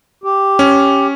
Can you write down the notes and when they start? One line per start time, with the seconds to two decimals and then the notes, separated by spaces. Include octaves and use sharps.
0.24 G4
0.59 C#4